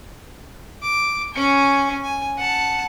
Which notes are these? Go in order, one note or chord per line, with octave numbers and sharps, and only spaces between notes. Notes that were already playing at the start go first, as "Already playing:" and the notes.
D6
C#4 G#5
G#5
F#5 A5